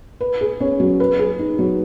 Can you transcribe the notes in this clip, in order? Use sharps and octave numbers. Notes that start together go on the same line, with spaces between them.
B4
G#4
C#4
F#3
B4
G#4
D#4
F#3